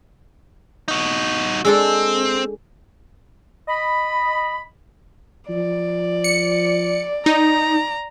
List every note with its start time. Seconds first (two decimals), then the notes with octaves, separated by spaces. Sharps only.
0.88 D#4 F#4
1.65 G#3 C4 D4 A4
3.68 D#5 B5
5.50 F3 D5
6.24 C#7
7.26 D#4 A#5